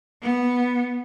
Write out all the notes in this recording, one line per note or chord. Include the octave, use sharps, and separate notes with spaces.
B3